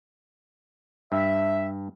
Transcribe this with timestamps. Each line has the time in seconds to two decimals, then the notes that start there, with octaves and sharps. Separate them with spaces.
1.12 G2 E5